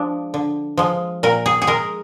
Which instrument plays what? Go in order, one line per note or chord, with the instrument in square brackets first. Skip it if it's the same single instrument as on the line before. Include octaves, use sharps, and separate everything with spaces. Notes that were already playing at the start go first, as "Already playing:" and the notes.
Already playing: [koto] F3 G#3 D4
D3
F3 G#3
A#2 A#4
G#4
G#4
G#3 A#4